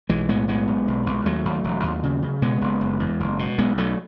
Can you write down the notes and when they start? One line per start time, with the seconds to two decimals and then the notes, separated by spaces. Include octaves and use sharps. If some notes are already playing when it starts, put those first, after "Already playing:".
0.09 B1 E3 G#3
0.29 A2 G#3 B3
0.48 B1 G#3 B3
0.67 B1
0.88 B1
1.06 B1
1.25 D#2 F#3 A3
1.45 D#2
1.64 E1
1.83 D#2
2.03 C#3
2.22 C#3
2.42 B2 G#3 B3
2.61 F#1
2.81 F#1
3.00 E2
3.20 F#1
3.39 B2
3.58 B1 G#3 B3
3.77 B1 F#3 A3